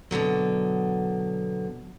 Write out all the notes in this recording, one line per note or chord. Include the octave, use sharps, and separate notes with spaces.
B2 D3 D#3 F#3